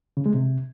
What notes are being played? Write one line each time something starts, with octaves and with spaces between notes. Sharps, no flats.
C#3
G#3
C3